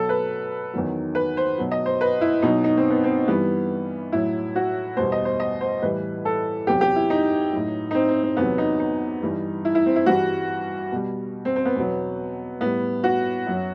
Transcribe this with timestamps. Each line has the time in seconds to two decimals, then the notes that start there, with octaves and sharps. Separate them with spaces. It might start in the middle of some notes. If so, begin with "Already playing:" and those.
Already playing: B2 F#3 A4
0.09 B4
0.74 E2 D#3 F#3
1.15 B4
1.37 C5
1.58 B2 F#3
1.71 D#5
1.86 C5
2.01 B4
2.21 E4
2.42 B2 F#3 D#4
2.64 D#4
2.77 C4
2.90 B3
3.04 C4
3.28 G2 E3 G3 B3
4.12 A2 F#3 E4
4.56 F#4
4.97 E2 B2 G3 C5
5.12 D#5
5.25 C5
5.40 D#5
5.61 C5
5.82 A2 E3 G3 B4
6.25 A4
6.67 E2 C3 F#3 G4
6.81 G4
6.96 E4
7.10 D#4
7.51 A2 F#3
7.91 D#4
7.95 C4
8.09 C4
8.23 C4
8.37 E2 C3 F#3 B3
8.58 D#4
8.80 D#4
9.22 G2 E3 G3
9.65 E4
9.75 E4
9.86 C4
9.96 E4
10.06 G2 E3 G3 F#4
10.92 B2 G3
11.45 C4
11.56 C4
11.65 B3
11.76 E2 B2 F#3
12.61 A2 G3 B3
13.04 F#4
13.47 F#2 F#3